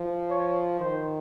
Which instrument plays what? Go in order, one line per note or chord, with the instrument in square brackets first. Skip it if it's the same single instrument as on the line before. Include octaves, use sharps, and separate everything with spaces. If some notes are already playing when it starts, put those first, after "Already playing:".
Already playing: [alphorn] F3
[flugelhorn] C#5
[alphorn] D#3 [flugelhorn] C5